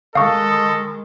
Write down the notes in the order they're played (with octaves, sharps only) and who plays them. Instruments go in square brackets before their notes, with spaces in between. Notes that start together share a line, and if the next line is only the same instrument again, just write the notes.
[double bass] D#3 G#3 [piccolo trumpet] A4 [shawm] D#5 [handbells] F5 C#6